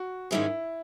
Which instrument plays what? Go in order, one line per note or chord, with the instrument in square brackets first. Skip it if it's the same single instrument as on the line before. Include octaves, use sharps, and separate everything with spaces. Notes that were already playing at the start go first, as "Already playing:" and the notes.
Already playing: [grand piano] F#4
[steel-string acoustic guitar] G#2 D#3 G#3 C#4 G#4 [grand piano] E4